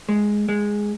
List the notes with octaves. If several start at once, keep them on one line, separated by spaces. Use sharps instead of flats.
G#3
G#3